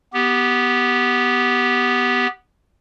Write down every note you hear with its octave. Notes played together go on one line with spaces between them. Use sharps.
B3 G4